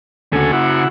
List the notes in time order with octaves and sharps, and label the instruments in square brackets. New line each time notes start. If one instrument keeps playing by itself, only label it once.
[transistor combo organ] D2 A4 G#5 [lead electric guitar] C#3 F#4
[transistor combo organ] E4 F#5